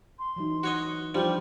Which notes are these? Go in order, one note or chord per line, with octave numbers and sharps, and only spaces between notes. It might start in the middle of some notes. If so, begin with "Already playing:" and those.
C6
E3 F#3 D#4
F#4 C#5 D#5
F3 G3 D4 G4